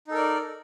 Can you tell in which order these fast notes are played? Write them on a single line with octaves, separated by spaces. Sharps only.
D#4 A4 A#4 D5